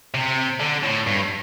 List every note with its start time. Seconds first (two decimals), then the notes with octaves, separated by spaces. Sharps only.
0.14 C3
0.60 D3
0.83 A2
1.07 G2